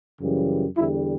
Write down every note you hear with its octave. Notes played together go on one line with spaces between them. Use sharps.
F#2 C#3 E3 G3
E2 D3 G3 E4